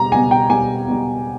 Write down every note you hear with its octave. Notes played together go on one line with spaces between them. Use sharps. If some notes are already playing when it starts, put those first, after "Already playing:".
Already playing: B2 G3 A#5
B2 G3 G#5
G5
B2 G3 G#5
B2 G3